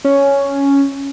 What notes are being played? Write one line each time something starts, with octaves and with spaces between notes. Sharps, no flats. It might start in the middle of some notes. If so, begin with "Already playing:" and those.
C#4